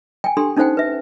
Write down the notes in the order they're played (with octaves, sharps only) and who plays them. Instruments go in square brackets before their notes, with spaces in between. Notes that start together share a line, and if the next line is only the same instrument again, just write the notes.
[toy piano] G5 G#5
D4 G4 A4 C6
C#4 D#4 A4 C5 F#5 G5
B4 E5